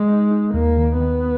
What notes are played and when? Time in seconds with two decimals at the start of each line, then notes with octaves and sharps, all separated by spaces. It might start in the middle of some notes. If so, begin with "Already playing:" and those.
Already playing: G#3
0.08 D#4
0.31 D#4
0.54 D#2 A#3
0.77 D#3
1.00 D#3 B3